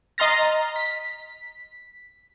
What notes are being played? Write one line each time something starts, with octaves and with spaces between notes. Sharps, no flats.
D#5 A#5 C6 F6 A6 A#6
B6